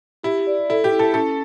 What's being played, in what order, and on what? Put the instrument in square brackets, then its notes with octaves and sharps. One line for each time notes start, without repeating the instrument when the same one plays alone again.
[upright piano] E4 [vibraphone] G4
[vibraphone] D5
[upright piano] E4 [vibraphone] A4
[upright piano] G4
[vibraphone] E4
[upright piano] A4
[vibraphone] C#4 [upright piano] A4